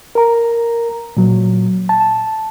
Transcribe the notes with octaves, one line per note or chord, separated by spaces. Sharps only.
A#4 A#5
A#2 F#3
A5